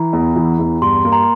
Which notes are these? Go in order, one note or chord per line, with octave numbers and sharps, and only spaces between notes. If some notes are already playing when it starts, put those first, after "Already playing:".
Already playing: E3 A#5
E2
E3
E2
G2 C6
A#3
A#5